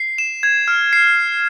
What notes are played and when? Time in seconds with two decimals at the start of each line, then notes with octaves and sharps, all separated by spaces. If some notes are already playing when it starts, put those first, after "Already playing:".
Already playing: C7
0.18 E7
0.43 G#6
0.68 F6
0.93 C7